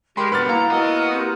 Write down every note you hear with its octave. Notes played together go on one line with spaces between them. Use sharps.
G#3 G4 A#4 B5 C6
G2 B2 B4 F#5 F6 A6
A#3 E4 A#5
B3 E4 F#4 A#4 D#5 D#6
C4 G4